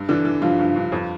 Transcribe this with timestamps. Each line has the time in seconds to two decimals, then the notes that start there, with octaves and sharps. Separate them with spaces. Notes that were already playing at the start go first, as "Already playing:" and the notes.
Already playing: G2
0.09 D3 E3 D4
0.25 E3
0.42 G2 F3 F4
0.59 G2
0.76 G2
0.92 F2